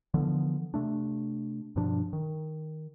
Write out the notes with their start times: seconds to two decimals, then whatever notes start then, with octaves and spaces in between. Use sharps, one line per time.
0.14 D3 E3 F3 B3
0.74 C3 A3 D4
1.76 G2 B2 F3 D4
2.13 D#3